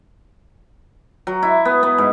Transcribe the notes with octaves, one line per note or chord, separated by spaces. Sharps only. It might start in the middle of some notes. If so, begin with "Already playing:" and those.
F#3
E4
B3
B3
G#2